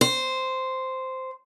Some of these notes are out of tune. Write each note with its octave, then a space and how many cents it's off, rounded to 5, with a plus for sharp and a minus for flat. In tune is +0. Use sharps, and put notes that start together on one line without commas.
C5 -5